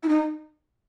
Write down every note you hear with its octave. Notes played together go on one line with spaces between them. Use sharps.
E4
D#4